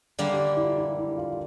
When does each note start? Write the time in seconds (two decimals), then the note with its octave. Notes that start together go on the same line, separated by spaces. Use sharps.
0.19 D3 G3 A#3 G#4
0.34 G4
0.49 G4
0.57 E4
0.63 F4
0.78 E4
0.98 E4
1.17 F4
1.31 F4